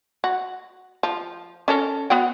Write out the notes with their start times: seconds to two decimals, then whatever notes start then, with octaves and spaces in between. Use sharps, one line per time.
0.24 F#4
1.03 F3
1.68 C#4 A4 A#4
2.10 B3 F#4 G5